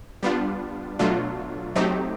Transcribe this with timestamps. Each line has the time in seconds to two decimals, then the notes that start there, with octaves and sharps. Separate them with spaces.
0.23 G3 B3 D4 F4
0.99 B2 F#3 A3 D4 F4
1.76 F#3 A3 C4 D#4 G4